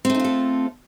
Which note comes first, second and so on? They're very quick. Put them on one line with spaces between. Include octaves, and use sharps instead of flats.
C4 A3 D#4 F4 A4